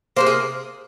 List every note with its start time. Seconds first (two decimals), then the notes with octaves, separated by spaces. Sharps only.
0.16 C3 D#3 A#3 C5
0.26 G#4